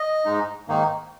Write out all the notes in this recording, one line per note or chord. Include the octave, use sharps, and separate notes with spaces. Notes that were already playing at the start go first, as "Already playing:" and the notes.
Already playing: D#5
G#2 G#3 D#4
G#2 D#3 A#3 D#4